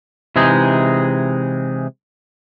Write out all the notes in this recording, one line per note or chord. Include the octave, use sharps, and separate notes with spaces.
C3 E3 G#3 D#4 G#4